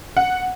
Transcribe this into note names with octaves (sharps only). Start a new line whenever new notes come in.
F#5